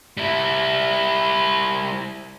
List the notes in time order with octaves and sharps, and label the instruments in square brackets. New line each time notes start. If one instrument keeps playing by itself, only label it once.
[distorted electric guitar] G3 E4